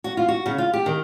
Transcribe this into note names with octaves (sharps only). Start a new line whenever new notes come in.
F#4
F4
F#4
C#3
F4
G4
D#3